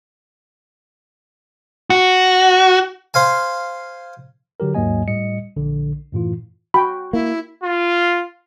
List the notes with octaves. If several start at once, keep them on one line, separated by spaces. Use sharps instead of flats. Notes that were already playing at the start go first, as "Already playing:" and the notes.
F#4
C5 F5 G#5
D3 F#3 G4 A#4
D#2 G#2 F#3 A#3 D#5 G#5
A2 G3 D#5 C#7
A#1 D3
F#2 A2 E3 F4
F#4 G5 B5
A#3 E4
F4